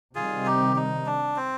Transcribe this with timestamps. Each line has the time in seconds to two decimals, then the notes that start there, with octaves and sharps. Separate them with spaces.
0.15 C3 D#3 G3 C4 F4 G#4
0.46 D#4 G4
0.76 D#4
1.06 D4
1.36 C4